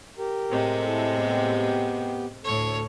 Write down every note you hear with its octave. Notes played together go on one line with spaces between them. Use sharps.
G4 A#4
A2 C3 G#3
E4 A4
B3 G4
D2 A2 A4 C#5